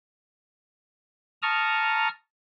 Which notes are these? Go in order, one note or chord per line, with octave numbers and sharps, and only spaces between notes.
A5 A#5 C#6 D#6 F6